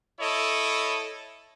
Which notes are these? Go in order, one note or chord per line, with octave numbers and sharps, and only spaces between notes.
E4 A4 C#5 D#5